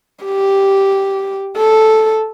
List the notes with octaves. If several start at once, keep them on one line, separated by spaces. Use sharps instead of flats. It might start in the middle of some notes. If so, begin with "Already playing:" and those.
G4
A4